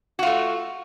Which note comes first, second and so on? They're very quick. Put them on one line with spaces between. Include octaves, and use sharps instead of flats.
F#4 F4 A3